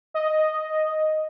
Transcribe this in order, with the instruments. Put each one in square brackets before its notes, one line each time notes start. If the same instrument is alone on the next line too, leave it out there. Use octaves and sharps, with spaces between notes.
[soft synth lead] D#5